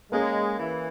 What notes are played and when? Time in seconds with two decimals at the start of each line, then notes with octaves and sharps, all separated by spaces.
0.11 G#3 A#3 C#4 G#4
0.59 E3